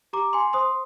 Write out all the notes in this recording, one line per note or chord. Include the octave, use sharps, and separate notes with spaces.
G4 A#5 D6
G#5 C6
C5 C6 D#6